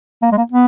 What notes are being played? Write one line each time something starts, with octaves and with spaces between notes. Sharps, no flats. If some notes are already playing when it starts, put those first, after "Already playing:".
A#3
G#3
A#3
B3